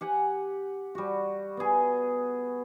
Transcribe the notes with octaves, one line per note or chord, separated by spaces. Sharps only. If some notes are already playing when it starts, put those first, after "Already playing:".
G4 F#5 G#5
G3 F#4
B3 G#4